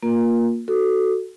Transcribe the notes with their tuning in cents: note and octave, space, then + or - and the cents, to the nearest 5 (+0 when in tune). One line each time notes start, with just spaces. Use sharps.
A#3 +0 F4 +20 A#4 +20
F#4 +10 A4 +0